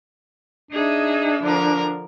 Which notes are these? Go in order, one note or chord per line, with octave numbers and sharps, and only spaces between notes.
D4 D#4 G#4 E5
D3 F3 A#4